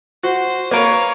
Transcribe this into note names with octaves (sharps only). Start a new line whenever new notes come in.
F#4 C5
A#3 A#4 B4 C#5